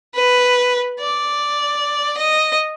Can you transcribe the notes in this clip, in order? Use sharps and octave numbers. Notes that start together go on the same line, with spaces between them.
B4
D5
D#5